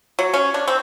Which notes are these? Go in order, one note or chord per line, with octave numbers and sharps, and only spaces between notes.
F#3
C#4
D4
C4